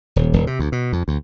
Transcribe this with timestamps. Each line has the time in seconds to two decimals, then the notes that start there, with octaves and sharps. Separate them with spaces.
0.16 D#1
0.33 D#1
0.47 C3
0.59 D2
0.72 B2
0.93 F2
1.08 D2